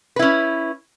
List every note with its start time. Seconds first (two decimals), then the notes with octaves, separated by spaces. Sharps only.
0.16 B4
0.19 E4
0.22 C#4